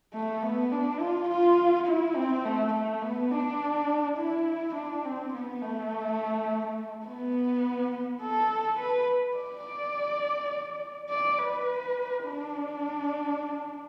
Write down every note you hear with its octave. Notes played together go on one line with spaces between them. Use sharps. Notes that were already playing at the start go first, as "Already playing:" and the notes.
A3
B3
D4
F4
F4
E4
C4
A3
A3
B3
D4
E4
D4
C4
B3
A3
B3
A4
B4
D5
D5
B4
D4